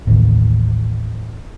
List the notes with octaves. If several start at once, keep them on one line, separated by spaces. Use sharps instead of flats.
A1 D#2